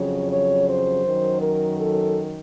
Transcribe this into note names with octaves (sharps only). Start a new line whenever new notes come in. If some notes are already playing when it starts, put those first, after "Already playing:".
Already playing: F2 C#3 F#3 C#5
C#5
C5
F#2 D#3 F#3
A#4
A4